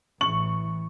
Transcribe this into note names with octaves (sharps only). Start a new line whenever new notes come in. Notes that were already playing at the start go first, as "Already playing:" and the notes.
A1 E3 C#6 F#7